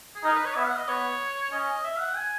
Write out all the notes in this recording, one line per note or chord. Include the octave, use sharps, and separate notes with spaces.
G#4
D#4 A#4
B4
C#5
B3 E5
F#5
D#5
B3 C#5
C#4 D#5
E5
F#5
G#5